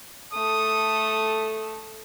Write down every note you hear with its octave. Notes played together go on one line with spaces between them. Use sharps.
A3 A4 D#6